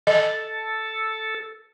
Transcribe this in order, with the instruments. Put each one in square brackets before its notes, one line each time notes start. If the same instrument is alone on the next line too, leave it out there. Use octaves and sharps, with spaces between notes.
[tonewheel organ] A4 [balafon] D#5